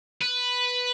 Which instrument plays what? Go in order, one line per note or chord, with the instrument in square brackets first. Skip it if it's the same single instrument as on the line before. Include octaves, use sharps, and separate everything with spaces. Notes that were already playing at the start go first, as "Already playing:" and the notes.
[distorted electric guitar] B4